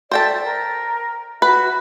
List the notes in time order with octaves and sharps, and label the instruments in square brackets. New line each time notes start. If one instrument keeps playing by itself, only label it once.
[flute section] A4 D5 E5 [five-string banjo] C5 G5 A5
[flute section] A#4
[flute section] F#4 E5 [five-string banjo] B4